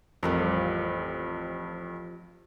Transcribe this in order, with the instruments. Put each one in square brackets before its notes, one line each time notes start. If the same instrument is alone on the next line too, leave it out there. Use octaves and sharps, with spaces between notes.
[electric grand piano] A1 F2 [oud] F3 G3 A#4